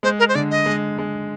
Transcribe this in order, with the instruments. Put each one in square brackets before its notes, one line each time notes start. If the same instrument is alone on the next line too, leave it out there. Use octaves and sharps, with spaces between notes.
[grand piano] G#3 [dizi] C5
[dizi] A#4
C5
[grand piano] D3 [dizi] D5
[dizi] D#5
[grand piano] G#3
G#3